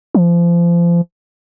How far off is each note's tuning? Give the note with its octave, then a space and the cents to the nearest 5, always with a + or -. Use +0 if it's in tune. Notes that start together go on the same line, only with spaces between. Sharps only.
F3 -30